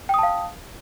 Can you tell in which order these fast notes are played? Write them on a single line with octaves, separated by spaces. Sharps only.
G5 D#6 A5 F5